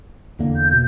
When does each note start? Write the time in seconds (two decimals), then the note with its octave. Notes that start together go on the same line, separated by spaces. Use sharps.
0.39 E2 D3 A#3
0.57 G6
0.72 B2